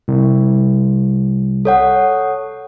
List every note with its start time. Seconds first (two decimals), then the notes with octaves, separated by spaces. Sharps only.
0.08 C2
1.65 A4 C#5 F#5